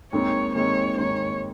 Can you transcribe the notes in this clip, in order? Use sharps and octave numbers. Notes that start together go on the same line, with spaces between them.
D#2 D#3 G#3 C4 C#5
D#2 D#3 G#3 C4 C#5
D#2 D#3 G#3 C4 C#5